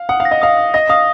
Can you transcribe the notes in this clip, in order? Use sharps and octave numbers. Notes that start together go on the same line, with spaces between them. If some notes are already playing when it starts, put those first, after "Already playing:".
Already playing: F5
F#5 D#6
F5
A#6
D#5
F5 D#6
D#6
D#5 A#6
F5 D#6